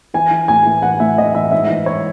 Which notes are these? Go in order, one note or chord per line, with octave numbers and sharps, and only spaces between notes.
E3 G#5
E3
A2 G#5
E3
E3 F#5
A2 E5
E3 D#5
E3 E5
G#2 E5
E3
C#5